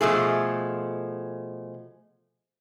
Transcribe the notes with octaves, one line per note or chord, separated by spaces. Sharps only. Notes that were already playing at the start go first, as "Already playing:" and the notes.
B2 F3 A3 G#4